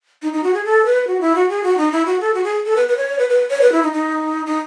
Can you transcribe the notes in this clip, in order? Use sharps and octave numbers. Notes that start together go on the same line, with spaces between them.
D#4
D#4
F#4
G#4
A4
B4
F#4
E4
F#4
G#4
F#4
D#4
E4
F#4
A4
F#4
G#4
A4
B4
B4
C#5
B4
B4
C#5
B4
E4
D#4
D#4
D#4